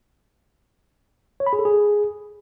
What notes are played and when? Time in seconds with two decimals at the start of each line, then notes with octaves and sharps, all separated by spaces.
1.40 C#5
1.46 B5
1.53 G#4
1.59 A4
1.65 G#4